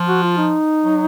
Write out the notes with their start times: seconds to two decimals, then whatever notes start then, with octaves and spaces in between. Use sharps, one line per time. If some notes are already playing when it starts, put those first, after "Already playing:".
Already playing: F3
0.08 F#4
0.23 F4
0.37 D#4
0.83 F#3